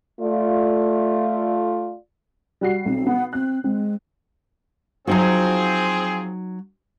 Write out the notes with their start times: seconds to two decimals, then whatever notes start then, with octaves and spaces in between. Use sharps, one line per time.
0.20 A3 F4 D5
2.61 G3 F#4 C7
2.85 B1 C4
3.07 B3 F#5
3.33 C4 F#6
3.64 G#3 C4
5.07 F3 F#3 C4 D#4 F#4 G#4